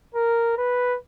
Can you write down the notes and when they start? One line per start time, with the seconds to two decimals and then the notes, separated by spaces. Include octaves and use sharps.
0.15 A#4
0.58 B4